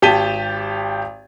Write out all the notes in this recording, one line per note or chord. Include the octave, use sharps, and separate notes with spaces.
G#1 G4 A5 B6 D#7 G7